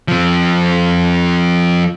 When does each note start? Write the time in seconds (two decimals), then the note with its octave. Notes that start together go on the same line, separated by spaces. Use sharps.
0.08 F3 C4